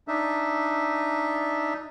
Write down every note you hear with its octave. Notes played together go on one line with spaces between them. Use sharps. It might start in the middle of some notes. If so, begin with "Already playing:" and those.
D4 D#4 E5